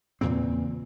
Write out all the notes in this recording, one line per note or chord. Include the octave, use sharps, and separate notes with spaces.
E2 A#2 C#3 C4